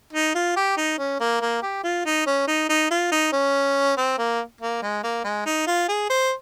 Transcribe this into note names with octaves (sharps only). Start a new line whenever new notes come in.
D#4
F4
G4
D#4
C#4
A#3
A#3
G4
F4
D#4
C#4
D#4
D#4
F4
D#4
C#4
C4
A#3
A#3
G#3
A#3
G#3
D#4
F4
G#4
C5